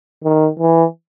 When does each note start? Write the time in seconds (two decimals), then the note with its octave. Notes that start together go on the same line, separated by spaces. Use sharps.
0.24 D#3
0.59 E3